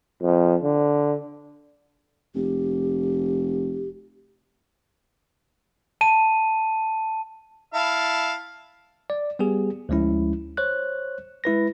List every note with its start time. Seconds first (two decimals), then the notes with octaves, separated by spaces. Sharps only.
0.22 F2
0.63 D3
2.35 F1 G4
6.01 A5 D#7
7.74 E4 F5 A5
9.10 D5
9.39 G3 B3 G4 G#4
9.89 D2 F3 G#3 C#4 E4
10.57 C5 C#5 F#6
11.44 G#3 E4 B4 A#6